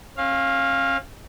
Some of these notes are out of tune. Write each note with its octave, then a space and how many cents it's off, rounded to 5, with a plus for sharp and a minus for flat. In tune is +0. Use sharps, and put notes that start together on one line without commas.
C#4 -40 F5 +0